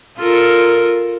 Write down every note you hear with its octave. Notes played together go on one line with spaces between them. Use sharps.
F4 A4 A#4